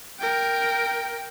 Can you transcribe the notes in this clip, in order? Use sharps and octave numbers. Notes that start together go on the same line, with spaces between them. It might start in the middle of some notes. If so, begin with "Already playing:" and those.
A#4 G5